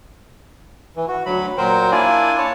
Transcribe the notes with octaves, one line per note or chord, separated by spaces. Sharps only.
E3
F#4
D2 F#3 B5
A#2 F#3 A#4 C5 G5
A#3 D4 E4 F4 D5 G#5
C#5 A5